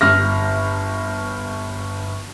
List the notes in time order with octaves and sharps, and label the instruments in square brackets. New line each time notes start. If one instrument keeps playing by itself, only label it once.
[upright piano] G1 F6 A#6